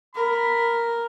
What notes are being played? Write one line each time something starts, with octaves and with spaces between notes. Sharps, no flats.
A#4 B5